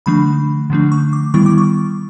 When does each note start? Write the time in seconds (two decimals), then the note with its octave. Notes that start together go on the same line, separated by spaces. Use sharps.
0.06 D3 F3 A3 D4 B5
0.70 D3 F3 A3 D4
0.92 C#6
1.13 D6
1.34 D#3 G3 B3 E4 C#6
1.46 D6
1.58 C#6